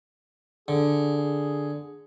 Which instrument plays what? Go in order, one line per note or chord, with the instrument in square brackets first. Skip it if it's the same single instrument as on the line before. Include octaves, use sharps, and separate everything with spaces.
[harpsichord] D3 [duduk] G#4
[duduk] G#4